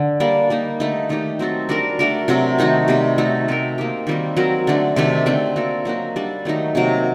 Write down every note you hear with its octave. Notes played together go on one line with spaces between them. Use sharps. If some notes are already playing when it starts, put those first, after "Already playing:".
Already playing: D3
G3 A#3 D4
G3 A#3 D#4
D3 A3 D#4
D#3 A3 D#4 G4
F#3 C4 F#4 A4
G3 D4 F#4 A#4
A3 D4 F#4 A#4
C3 F#3 C4 F#4
D#3 A3 D#4 F#4
C3 G3 C4 G4
A3 D#4 F#4 A4
A3 C4 F#4 A#4
A#3 D#4 G4
D#3 G3 C4 F#4
F#3 C4 F#4 A#4
D3 A3 D4
C3 D#3 A3 D4
D3 A3 C4
A#3 F#4 A4
F#3 A#3 D#4 F#4
G3 D4 A4
D#3 F#3 A3 D#4
C3 F#3 A#3